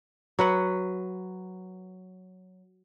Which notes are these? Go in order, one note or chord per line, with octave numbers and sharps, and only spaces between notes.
F#3 B4 F#5